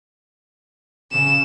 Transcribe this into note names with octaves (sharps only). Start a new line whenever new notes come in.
C#3 E7